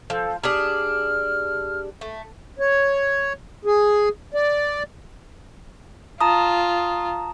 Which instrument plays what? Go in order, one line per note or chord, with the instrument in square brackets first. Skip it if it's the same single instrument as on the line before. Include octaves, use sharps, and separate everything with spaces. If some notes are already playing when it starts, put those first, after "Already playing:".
[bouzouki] F3 [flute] A4
[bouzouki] D4 G4 G#4 [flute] F6
[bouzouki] A3
[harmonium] C#5
G#4
D5
[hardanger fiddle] F4 [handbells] A5 A#5 D#6